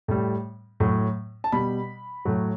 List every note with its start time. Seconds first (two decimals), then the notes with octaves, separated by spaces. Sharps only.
0.08 A2 G3
0.80 A2 F#3
1.44 A5
1.52 B2 G3 B5
2.25 A2 F#3